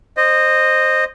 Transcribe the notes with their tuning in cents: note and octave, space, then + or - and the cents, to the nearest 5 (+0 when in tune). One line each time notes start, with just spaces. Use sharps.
C5 +10 D#5 -15